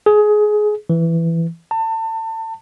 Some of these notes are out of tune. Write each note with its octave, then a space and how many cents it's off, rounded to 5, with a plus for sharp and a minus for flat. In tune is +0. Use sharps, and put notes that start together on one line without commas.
G#4 +20
E3 +10
A5 +30